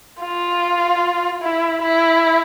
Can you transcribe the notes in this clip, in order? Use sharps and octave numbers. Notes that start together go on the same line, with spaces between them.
F4
E4
E4